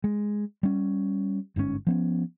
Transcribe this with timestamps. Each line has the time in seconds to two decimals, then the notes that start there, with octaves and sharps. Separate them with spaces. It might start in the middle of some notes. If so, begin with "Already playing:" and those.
0.04 G#3
0.63 G3 C#4
1.56 G1 G#2 B2 C#4
1.87 F3 B3 C#4